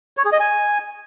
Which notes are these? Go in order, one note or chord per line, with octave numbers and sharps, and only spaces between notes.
C#5
G#4
D#5
G#5